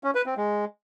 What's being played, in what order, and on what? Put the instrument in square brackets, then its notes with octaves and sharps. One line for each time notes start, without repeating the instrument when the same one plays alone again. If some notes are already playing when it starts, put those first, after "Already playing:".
[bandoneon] C#4
B4
C4
G#3